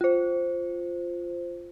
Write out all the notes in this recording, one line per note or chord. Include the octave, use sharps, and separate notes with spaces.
F4 C5